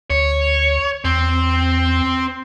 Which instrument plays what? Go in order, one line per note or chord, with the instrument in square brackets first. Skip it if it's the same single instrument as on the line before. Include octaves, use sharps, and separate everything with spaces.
[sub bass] D2 [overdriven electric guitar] C#5
[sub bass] E2 [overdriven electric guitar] C4